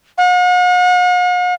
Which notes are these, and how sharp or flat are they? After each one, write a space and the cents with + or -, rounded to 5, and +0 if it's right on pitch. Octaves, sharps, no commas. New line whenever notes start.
F#5 -45